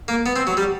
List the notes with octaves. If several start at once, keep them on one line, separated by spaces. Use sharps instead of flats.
A#3
B3
C4
F#3
G3